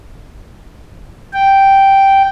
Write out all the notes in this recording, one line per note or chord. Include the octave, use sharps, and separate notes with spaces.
G5